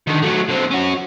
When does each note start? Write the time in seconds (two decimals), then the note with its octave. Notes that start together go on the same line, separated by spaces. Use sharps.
0.07 D3 D#3
0.22 F#3 A3
0.49 D3 C4
0.71 C#4 F#4